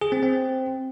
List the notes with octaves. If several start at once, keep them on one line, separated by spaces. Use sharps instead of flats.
G#4
C4
C4